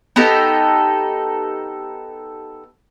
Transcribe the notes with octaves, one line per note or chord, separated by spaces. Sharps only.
B3 D#4 G4 A4